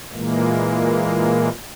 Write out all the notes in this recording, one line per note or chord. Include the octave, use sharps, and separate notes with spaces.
A#2 E3 G#3 A#3